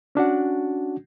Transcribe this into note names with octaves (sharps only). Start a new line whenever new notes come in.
C#4 D4 F#4 F#5